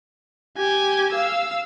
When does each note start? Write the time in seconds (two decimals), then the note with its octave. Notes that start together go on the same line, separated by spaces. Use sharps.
0.57 G4 G#5
1.12 F5 E6